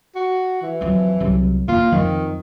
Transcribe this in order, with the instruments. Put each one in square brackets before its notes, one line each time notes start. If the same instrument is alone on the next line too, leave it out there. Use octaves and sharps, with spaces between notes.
[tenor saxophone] F#4
E3
[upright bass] F2 F#3
C2 F#3
[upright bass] A#3 [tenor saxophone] F4
[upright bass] F2 F3 [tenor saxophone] D#3